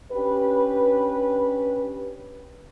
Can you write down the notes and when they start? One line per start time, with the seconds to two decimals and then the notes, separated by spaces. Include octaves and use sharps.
0.12 C#4 D4 G4 B4